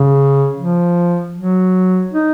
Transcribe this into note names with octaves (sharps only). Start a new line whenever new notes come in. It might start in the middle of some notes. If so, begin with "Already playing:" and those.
Already playing: C#3
F3
F#3
D#4